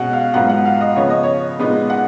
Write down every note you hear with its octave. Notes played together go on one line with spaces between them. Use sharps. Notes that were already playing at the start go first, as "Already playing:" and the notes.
Already playing: B2 G#3 C#4 F#5
F5
G#2 F#3 B3 F4 F#5
F#5
F5
D#5
C#3 F3 B3 C#5
D#5
C#5
A#2 G#3 B3 D#4
F#5